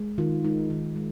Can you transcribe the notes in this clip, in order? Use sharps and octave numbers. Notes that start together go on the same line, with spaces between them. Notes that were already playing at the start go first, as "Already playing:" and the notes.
Already playing: G#3
D#3 F4
G#3 D#4
D#3
G#3